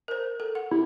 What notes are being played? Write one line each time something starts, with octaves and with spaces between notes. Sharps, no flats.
A#4 C5
A4
F#5
C3 E4